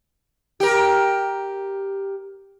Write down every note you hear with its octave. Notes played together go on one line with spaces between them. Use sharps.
G4 A#4